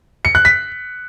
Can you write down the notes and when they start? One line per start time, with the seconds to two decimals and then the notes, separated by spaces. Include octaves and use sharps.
0.25 C#7
0.35 F#6
0.45 B6